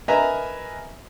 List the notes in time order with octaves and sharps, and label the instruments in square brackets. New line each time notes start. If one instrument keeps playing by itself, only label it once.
[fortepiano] A#4 B4 D#5 E5 G#5 A#5